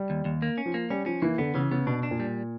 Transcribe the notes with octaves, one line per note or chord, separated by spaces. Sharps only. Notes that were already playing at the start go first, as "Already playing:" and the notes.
Already playing: G3
D#2
D#2
A#3
C#4
F3
A#3
G3 C#4
F3 C#4
E3 A#3
D3 B3
C#3 E3
C#3 B3
B2 D4
D4
A#2
G3